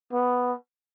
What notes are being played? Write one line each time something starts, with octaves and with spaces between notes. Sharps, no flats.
B3